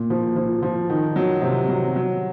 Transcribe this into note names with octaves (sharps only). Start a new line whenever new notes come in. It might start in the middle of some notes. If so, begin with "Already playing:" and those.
Already playing: A#2
F3
F3
F3
D#3
F#3
C3
F#3
F#3